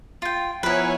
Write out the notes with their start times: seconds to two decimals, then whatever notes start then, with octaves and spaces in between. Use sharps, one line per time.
0.22 F4 G5
0.63 F3 B3 E4 A#4 B4 C#5 G#5